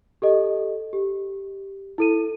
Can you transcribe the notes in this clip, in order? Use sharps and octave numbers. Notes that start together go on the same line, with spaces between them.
G4 A4 D#5
G4
E4 A4 D#7